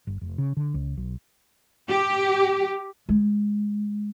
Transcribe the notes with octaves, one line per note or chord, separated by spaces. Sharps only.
G1
F1
C#3
D3
C#2
B1
G4
G#3